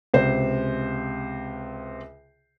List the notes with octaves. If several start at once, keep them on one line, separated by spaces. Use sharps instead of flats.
C#2 C3 C5